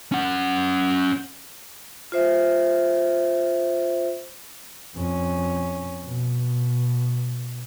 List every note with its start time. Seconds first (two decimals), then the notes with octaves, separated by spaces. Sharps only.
0.12 C#4 F#5
2.12 F4 C5 E5
4.96 F2 C#4
6.05 B2